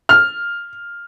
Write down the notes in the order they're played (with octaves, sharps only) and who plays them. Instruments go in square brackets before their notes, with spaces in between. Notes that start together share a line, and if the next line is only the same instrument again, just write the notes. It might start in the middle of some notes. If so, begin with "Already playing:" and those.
[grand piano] F6